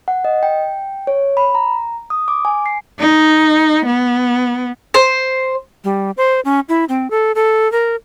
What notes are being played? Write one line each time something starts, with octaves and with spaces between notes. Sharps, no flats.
F#5
D#5
G5
C#5
B5
A#5
D#6
D6
G#5
C7
D#4
B3
C5
G3
C5
C#4
E4
C4
A4
A4
A#4